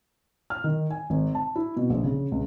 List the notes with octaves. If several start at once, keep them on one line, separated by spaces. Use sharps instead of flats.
F6
D#3
G#5
G#1
A5
E4
B2
A#1
C#3
C#2